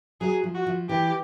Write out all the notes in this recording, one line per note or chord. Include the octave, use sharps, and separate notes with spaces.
F#3 G#4
F3
F#4
F3
E3 G4